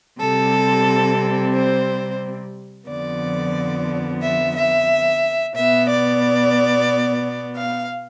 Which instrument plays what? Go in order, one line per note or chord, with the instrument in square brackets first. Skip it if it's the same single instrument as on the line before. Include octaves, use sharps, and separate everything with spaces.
[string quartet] C3 G3 C4 A4
C5
F2 D3 F3 B3 D5
E5
E5
B2 B3 E5
D5
F5